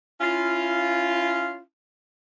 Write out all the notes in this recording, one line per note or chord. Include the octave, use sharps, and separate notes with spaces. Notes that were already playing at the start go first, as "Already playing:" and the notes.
C#4 E4 F4